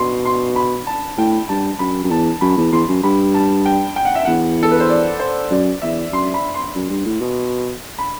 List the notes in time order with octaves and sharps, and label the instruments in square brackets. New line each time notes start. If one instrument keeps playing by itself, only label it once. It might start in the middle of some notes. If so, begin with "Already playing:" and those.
Already playing: [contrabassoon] B2 [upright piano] C6
[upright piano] C6
B5
A5
[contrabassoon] A2 [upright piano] G5
[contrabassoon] G2 [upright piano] A5
[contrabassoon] F#2 [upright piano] B5
[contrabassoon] F#2
[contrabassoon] E2 [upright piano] A5
[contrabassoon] F#2 [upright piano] B5
[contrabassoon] E2
[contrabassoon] E2 [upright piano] C6
[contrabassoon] F#2
[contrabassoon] G2 [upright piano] B5
[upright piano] A5
G5
G5
F#5
E5
[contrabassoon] E2 [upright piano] F#5
[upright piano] A4
B4
C5
D5
C5
[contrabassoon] F#2 [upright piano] D5
[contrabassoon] E2 [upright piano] E5
[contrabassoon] F#2 [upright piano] C6
[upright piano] B5
C6
[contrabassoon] F#2
G2
A2
B2
[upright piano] B5